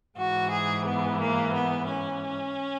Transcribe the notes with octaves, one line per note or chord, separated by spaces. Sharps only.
G#2 E3 F#4
G#4
B3
A#3
B3
C#4